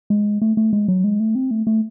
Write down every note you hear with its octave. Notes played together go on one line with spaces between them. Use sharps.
G#3
A3
A3
G#3
F#3
G#3
A3
C4
A3
A3